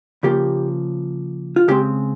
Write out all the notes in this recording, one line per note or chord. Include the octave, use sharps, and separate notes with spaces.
C#3 F3 A#3 G4
F4
C#3 G#3 C4 G4